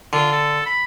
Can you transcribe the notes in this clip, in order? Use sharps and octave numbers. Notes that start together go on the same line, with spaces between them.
D3 F4
A4
B5